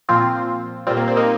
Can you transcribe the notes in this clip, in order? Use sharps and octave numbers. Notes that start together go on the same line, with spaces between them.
A#2 F3 C4 F4
A#2 G3 C4 F4
A#3
C4
A#3 D#4